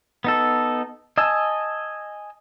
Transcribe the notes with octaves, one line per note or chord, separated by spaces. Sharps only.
B3 D#4 A4
D#5 G#5 A5 E6